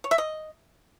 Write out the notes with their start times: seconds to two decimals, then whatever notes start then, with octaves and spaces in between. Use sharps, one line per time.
0.04 C#5
0.11 E5
0.18 D#5